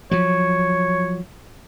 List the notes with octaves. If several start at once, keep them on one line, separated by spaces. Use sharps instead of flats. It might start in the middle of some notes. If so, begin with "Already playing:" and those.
F3 F#3 C#5